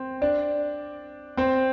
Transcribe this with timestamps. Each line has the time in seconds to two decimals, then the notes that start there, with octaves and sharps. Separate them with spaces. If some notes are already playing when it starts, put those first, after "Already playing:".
Already playing: C4 C5
0.22 D4 D5
1.37 C4 C5